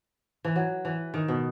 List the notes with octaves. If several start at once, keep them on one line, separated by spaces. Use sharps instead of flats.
E3
F#3
E3
D#3
B2